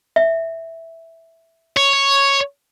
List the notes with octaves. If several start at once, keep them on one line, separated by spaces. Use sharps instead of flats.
E5
C#5